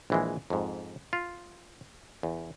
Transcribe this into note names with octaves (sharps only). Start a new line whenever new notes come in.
A#1 E3 G#3
F2 G#2
F4
E2